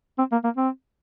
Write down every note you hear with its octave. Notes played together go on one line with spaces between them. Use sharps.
C4
A#3
A#3
C4